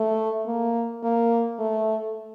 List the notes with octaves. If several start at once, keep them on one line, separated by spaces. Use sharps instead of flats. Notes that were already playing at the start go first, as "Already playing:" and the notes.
Already playing: A3
A#3
A#3
A3